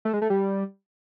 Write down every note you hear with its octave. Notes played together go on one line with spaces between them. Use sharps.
A3
G#3
A3
G3